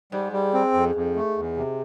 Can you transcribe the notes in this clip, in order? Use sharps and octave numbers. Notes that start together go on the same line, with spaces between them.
G#2 G3
G3
C4
F2
F2
A3
E2
C3